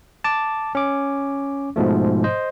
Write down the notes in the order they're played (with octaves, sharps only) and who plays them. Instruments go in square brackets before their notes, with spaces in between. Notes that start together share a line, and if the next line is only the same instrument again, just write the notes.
[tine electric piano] A5 D6
C#4 D6
G#2 B2 F3 A3
C5 D#5